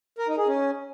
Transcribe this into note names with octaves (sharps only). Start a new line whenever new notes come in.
A#4
D#4
G#4
C#4